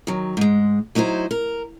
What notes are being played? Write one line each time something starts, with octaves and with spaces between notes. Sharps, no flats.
D#3 F#3
G#2 G#3
F#3 D#4 E4 A#4 C5
A#4